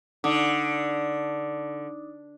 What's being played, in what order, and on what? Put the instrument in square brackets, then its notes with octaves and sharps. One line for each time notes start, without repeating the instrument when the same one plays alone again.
[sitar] D3 [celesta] D#4 D6 D#6